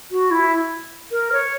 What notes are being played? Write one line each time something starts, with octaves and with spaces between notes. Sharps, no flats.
F#4
E4
A#4
C#5